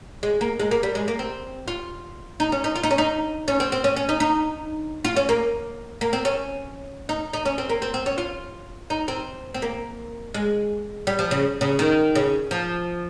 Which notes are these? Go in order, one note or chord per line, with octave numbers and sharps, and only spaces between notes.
G#3
A#3
G#3
A#3
G3
G#3
A#3
C4
F4
D#4
C#4
D#4
F4
D#4
C#4
D#4
C#4
C4
C4
C#4
C#4
D#4
D#4
F4
C#4
A#3
A#3
C4
C#4
D#4
D#4
C#4
C4
A#3
C4
C4
C#4
F4
D#4
C4
C4
A#3
G#3
G3
F3
C#3
C#3
D#3
C#3
F3